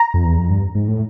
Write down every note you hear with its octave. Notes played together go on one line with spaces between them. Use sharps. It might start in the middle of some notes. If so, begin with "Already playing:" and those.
Already playing: A#5
F2
E2
F2
G2
G#2
A2